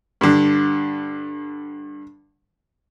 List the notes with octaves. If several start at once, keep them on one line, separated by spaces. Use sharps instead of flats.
G2 D3